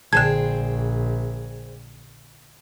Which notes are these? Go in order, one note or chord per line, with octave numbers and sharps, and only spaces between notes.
A#1 D3 G#4 C5 G5 A5 G#6